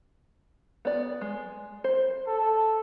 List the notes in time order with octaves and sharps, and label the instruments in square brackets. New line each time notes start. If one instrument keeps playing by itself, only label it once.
[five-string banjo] B3 D5
G#3
C5
[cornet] A4